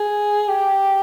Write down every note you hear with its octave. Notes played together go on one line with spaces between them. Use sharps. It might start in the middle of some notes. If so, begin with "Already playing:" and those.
Already playing: G#4
G4